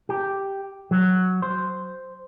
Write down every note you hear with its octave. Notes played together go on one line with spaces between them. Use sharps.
G4
F#3
C5